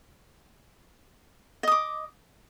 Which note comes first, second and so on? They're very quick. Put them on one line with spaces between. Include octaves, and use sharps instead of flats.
D#5 D#6 D6